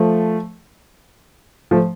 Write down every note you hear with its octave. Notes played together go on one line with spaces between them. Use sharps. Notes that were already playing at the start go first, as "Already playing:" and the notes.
Already playing: F3 A3
F3 A3